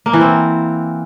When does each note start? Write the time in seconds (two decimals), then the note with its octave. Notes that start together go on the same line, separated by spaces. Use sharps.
0.06 A#3
0.13 E3
0.21 C4